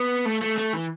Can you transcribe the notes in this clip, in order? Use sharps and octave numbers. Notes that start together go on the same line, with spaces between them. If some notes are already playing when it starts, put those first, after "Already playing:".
Already playing: B3
A3
A3
A3
E3